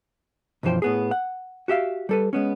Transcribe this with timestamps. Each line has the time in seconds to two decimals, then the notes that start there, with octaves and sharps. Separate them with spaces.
0.63 B1 F#2 E3 F3 C5 G5
0.82 A2 B3 G#4
1.11 F#5
1.68 F#4 G4 E5 F5
2.09 G3 A4 B4
2.33 G#3 B3 C#4